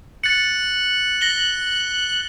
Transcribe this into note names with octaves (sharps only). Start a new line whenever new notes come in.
F#6 A6 C#7
A#6 F#7 G7